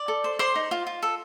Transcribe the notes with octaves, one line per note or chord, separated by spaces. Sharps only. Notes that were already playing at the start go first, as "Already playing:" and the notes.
Already playing: D5
A4
C5
C5 D5 C6
D#4
F4
F4
A4